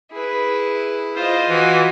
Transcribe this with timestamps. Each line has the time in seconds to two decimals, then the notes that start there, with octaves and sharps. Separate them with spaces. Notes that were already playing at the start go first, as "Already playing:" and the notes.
0.12 E4 G#4 B4
1.15 F4 C5 D#5
1.48 E3 F#4 G#5